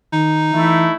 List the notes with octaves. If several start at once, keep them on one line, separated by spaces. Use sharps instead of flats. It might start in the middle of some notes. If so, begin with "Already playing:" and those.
D#3 D#4
E3 A3 E4